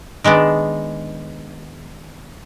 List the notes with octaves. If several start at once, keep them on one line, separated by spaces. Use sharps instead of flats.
D#3 G#3 B3 D4